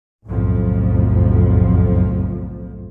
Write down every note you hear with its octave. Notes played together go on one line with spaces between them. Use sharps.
F#1 B1 F2 A2 F3